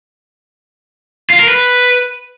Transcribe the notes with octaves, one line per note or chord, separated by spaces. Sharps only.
F4
A#4
B4